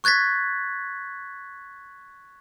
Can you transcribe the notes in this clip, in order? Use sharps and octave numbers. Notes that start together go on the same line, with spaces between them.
C#6 F#6 G#6 A6 B6